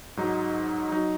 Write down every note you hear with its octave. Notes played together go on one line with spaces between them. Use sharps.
G#2 F#3 D#4
F#3 D#4